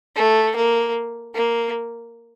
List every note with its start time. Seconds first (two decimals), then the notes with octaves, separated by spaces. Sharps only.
0.16 A3
0.56 A#3
1.35 A#3